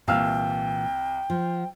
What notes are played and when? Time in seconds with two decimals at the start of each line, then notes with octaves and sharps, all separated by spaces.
0.08 C2 A#2 E3 F5 G5 E6 F6
1.30 F3